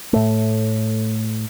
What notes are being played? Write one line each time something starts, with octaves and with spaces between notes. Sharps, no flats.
A2 A3